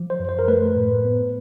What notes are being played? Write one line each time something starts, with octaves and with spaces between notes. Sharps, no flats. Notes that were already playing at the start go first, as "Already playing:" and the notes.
Already playing: F3
C5
F#2
C5
A#4
A3 B4
A2
B3